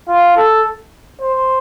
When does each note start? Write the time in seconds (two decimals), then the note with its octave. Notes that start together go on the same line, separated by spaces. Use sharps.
0.08 F4
0.37 A4
1.21 C5